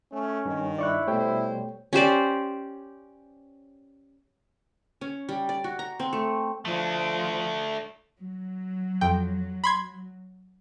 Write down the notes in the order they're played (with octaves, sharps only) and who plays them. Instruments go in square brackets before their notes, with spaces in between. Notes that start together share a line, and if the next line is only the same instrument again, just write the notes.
[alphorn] A3 [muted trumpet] C#4
[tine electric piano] G2 [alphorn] D#3
[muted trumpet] E4 [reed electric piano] D5 C#6 F#6
[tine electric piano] B2 G3 [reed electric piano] A3 C#5 G5 [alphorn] C5
[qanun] C#4 G4 C5 D5
C#4
G3
D5
F#4
A#5
C4
A3
[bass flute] F3 [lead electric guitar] A3 D4
[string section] F#3
[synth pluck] F2 G5
B5 C6 G#6